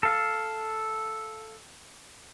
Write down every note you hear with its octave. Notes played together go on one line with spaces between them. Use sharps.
A4 F5